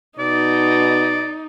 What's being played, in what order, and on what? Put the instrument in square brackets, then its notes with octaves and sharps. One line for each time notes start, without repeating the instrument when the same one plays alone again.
[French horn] B2 [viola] D#4 [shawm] D5